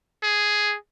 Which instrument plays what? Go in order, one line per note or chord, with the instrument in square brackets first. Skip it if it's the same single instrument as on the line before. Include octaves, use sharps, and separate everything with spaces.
[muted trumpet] G#4